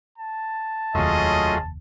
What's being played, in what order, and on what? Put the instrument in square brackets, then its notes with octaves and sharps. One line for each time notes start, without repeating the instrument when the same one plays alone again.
[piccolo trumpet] A5
[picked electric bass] F1 D#2 [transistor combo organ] F#3 A3 F4 [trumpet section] C#4 G#4 D#5